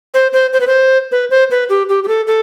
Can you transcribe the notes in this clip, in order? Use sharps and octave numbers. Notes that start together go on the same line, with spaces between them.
C5
C5
C5
B4
C5
B4
C5
B4
G4
G4
G4
A4
A4